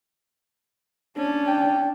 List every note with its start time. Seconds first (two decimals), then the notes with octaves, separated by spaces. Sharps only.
1.17 C#4 D4
1.47 G5